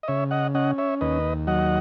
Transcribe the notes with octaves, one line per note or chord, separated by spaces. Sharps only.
D#5
C#3 C#5 E5
D#5 F#5
C#4 D#5 F#5
C#5 E5
D#2 B4 D#5
F#3 D#5 F#5